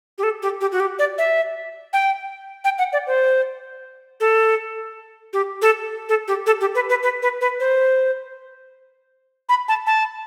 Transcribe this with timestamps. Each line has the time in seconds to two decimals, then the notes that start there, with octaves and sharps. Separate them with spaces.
0.18 G4
0.23 A4
0.42 G4
0.61 G4
0.72 F#4
0.80 G4
0.99 D5
1.18 E5
1.93 G5
2.64 G5
2.78 F#5
2.93 D5
3.07 C5
4.20 A4
5.33 G4
5.62 A4
6.09 A4
6.28 G4
6.46 A4
6.61 G4
6.75 B4
6.89 B4
7.03 B4
7.22 B4
7.41 B4
7.60 C5
9.49 B5
9.68 A5
9.86 A5